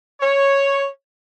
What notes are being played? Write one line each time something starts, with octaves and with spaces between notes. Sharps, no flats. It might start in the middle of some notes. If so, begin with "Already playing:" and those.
C#5